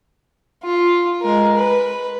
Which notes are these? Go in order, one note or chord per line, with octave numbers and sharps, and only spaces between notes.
F4
G#3 A#4
B4